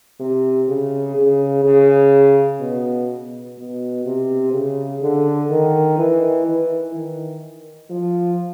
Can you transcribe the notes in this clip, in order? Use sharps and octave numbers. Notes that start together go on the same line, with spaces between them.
C3
C#3
C#3
C#3
B2
B2
C3
C#3
D3
D#3
E3
E3
D#3
F3